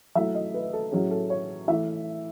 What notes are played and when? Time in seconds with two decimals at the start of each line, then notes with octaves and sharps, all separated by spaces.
0.15 F#3 A3 E4 E5
0.35 D#5
0.54 B4
0.73 A4
0.92 A2 F#3 C#4 G#4
1.11 A4
1.30 C#5
1.68 E3 A3 E4 E5